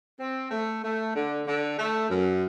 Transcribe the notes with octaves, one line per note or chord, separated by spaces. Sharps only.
C4
A3
A3
D3
D3
A3
F#2